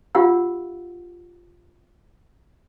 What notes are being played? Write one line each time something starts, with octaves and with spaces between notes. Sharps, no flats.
D4 F4 G4 F5 F#5 E6